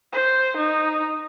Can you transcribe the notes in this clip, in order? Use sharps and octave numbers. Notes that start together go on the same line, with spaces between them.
C5
D#4